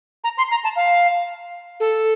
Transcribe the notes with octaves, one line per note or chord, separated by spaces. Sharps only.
A#5
C6
A#5
A5
F5
A4